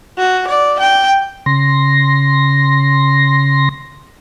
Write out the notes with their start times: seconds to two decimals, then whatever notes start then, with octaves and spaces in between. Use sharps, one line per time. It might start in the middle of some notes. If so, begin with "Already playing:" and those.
0.18 F#4
0.47 D5
0.79 G5
1.46 C#3 C6 A#6